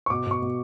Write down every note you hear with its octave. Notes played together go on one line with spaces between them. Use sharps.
C#6
B2 D6
B2 C#6
B2